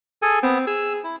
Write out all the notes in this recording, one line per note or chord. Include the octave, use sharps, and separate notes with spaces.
G#4 A4 G#5
B3 C4
G#4 E6
E4